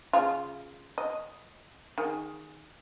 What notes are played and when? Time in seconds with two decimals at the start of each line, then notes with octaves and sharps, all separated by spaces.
0.13 C#3 F4
0.98 D#5
1.98 D#3 G#4